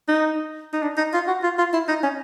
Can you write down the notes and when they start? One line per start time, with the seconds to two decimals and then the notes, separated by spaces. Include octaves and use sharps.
0.08 D#4
0.73 D#4
0.83 D4
0.97 D#4
1.13 F4
1.28 F#4
1.43 F4
1.58 F4
1.73 E4
1.88 D#4
2.03 C#4